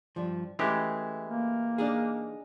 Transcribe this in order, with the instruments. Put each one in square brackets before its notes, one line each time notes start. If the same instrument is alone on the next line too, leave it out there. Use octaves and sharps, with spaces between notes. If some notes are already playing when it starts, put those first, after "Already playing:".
[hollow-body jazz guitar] G2 F3
[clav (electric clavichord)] E3 G#3 G4 [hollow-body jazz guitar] A3 C#4 E4
[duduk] A#3
[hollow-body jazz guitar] D4 D#4 G#4